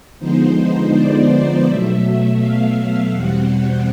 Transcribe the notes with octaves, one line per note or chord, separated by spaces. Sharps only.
D3 F3 G#3 B3 D#4 C5
D5
B2 F#3 A3 E5
F5
E2 B2 G3 C4 F#5